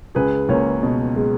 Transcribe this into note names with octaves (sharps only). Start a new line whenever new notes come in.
C#2 G#4 B4
C#2 A#3 C#4
B2
G#3